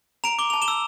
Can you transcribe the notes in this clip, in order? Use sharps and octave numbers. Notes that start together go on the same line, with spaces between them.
A#5 D7 F7
D6 G7
A5 F7
E7 G7
E6